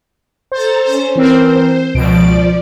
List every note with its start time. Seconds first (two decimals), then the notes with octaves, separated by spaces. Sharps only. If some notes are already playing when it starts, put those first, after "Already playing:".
0.52 A4 C5 A#5 A6
0.85 C#4 C5
1.15 E3 C4 A#4 C5
1.95 C#2 B2 F3 D5 D7